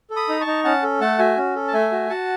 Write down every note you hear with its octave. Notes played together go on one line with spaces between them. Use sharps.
A4
B5 D#6
D#4
A5 C#6
D#4
C#4 F#5 A5
A4
A3 F#5 A5
F#4 E5 G#5
C#4
A4
A5
A3 E5 G#5
F#4
F#4 F#5 A5